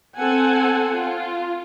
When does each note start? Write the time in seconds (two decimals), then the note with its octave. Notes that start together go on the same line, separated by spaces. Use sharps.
0.15 C4 A4 F#5 G#5
0.94 F4